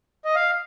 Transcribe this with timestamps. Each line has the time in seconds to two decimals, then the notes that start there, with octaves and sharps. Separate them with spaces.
0.25 D#5
0.35 F5